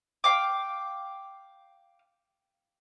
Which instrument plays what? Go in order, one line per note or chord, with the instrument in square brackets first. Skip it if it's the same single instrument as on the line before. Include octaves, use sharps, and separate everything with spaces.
[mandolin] F5 G5 D6